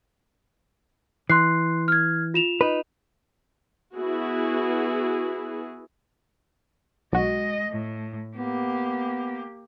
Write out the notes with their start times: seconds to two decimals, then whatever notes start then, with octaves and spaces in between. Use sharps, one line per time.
1.30 E3 C6 F#6 C7
1.88 F6 G#6
2.34 F4 E7 F7
2.61 D#4 B4
3.95 B3 E4 F#4 G#4
7.13 B1 G#3 F#4 D#5
7.69 A2
8.37 A#3 B3 G4